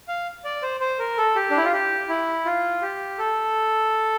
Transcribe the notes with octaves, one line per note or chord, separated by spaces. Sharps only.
F5
D5
C5
C5
A#4
A4
G4
D4
E4
F4
G4
E4
F4
G4
A4